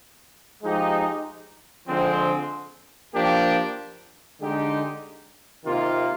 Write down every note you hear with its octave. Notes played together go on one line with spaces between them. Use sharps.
F3 G#3 D#4 G4
D3 F3 G#3 C4
F3 A#3 D4 G4
D3 G#3 D#4 G4
C3 D#3 A#3 F4